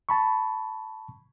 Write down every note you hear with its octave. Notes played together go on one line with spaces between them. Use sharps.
A5 B5 C#6